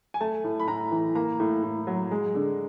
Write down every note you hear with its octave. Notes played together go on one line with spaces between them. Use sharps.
G#5
A3 A5
A2
B5
A2 A#5
E3
A#3 A#5
A2
A2
F#3
G#3
D3